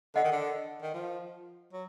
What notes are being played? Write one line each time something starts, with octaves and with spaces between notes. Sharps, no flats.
D3 D#5 F#5
D#3
D3
D#3
F3
F#3